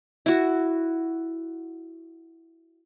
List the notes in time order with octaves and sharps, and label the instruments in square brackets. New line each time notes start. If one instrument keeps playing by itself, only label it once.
[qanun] E4 F#4